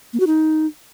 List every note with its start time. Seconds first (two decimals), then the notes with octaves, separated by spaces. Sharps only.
0.13 A#3
0.20 F#4
0.27 D#4